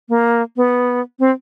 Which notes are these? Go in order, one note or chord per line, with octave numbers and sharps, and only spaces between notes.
A#3
B3
C4